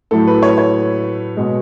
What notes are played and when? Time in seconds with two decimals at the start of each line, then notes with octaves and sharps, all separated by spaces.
0.11 A2 F#3 A3 A4
0.27 B4
0.43 C#5
0.58 C#5
1.37 B2 G#3